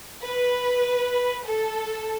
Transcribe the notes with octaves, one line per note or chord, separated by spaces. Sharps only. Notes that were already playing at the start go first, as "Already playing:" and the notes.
B4
A4